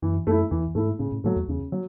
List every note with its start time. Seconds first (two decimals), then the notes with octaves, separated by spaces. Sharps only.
0.02 F#2 E3
0.27 F#2 A3 E4
0.51 E2 E3
0.75 G#2 A3 E4
0.99 A2 C#3
1.12 A2
1.24 A2 F#3 A3
1.36 E2
1.48 E2 C#3
1.72 F#3